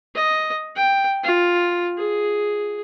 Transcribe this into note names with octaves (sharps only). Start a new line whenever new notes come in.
D#5
G5
F4
G#4